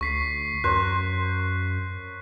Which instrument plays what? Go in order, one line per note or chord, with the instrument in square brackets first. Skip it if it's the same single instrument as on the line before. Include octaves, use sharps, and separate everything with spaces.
[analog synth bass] D2 [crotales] C#6 B6 C7
[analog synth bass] F#2 [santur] A#4 C5 C#5 [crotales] F#6